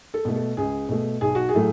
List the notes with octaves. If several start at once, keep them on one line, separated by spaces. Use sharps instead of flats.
A4
B2 A3
A4
C#2 G#4
B2 A3
B1 G#4
F#4
G#4
A2 F#3 A3